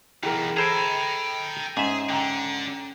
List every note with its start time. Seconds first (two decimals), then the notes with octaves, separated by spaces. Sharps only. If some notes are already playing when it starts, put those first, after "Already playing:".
0.23 E3 B3 D#4 G#4 A#4 G5
0.57 G#4 A4 C5 G5 A#5 B5 G#6
1.77 G#2 C#4 G#4 E5
2.09 D3 G5 A#5